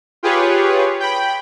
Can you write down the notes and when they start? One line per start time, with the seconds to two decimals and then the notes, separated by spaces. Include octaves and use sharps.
0.23 F4 G4 G#4 B4 C#5
1.00 G5 B5